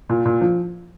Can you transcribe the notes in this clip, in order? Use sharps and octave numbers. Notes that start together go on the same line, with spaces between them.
A#2
A#2
F3